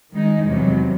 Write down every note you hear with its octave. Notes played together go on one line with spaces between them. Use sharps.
D#3 G#3 D#4
E2 C3 F#3